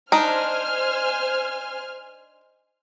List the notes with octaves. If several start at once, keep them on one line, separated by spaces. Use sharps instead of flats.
D4 D#4 C5 G#5 F6